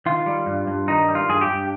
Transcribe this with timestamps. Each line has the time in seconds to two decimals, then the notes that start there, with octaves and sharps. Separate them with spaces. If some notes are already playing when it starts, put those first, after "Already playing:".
0.06 D#3 F4
0.26 G3
0.46 G2
0.67 G2
0.88 D#3 D#4
1.08 G3
1.15 F4
1.29 G2 G#4
1.41 G4
1.48 G2